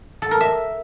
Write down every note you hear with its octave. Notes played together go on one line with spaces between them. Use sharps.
A4
A#4
E5